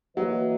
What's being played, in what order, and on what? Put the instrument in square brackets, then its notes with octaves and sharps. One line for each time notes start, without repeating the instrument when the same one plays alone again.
[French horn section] E3 A#3 E4 B4 D#5 [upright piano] F#3